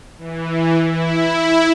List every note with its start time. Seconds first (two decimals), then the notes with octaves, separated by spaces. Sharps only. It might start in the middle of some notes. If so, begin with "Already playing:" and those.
0.18 E3
0.82 E4